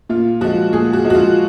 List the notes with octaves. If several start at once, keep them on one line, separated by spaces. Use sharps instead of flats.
A#2 F4
F3 G#3 F#4
A#2 G#4
F#4
F3 G#3
F#4
F4